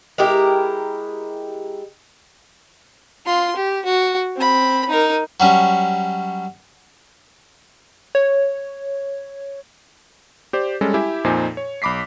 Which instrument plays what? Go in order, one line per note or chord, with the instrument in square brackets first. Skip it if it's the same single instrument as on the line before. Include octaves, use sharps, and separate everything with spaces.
[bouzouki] G#3 E4 G4 A#4
[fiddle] F4 C6
G4
F#4
C4 B5
D#4 A#4
[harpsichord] F#3 G3 C#4
[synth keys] C#5
[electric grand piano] G4 C5 D5
G3 G#3 C#4 A4
E4 G4 E5 G#5
F2 A#2 D#4 C5 G#5
C#5
B1 B5 D6 B6 C7